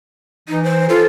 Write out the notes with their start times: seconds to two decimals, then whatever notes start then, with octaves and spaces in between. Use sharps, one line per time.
0.48 E3 D#4
0.64 C5
0.89 F4 A4